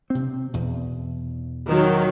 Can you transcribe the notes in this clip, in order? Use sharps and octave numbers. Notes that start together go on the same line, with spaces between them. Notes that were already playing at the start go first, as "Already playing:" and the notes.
C3 C4
E2 B2
D#3 F#3